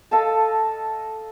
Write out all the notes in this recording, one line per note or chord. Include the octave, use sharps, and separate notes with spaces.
A4 D#5 F5 A5